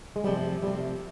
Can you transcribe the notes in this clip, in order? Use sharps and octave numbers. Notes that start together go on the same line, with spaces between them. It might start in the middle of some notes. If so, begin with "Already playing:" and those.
G#3
C3 F3 G3 A3
C3 F3 G3 A3